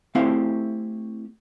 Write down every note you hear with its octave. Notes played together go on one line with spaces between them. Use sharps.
A3 C4 E4 G4 C5 F5